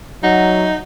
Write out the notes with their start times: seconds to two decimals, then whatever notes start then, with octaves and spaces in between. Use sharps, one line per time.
0.23 F#3 D#4 E5 F#5